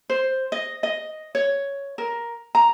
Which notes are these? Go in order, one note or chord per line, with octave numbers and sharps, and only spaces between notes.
C5
D#5
D#5
C#5
A#4
A#5